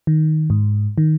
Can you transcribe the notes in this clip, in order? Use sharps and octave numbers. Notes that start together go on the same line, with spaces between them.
D#3
G#2
D#3